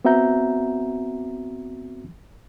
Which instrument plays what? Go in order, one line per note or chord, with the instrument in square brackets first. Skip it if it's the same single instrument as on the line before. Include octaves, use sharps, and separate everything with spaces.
[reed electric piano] B3 C4 F#4 E5 A#5 G6